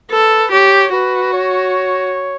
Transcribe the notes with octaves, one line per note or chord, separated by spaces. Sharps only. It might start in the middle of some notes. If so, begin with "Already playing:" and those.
A4 B4
G4 C#5
F#4 B4
C#5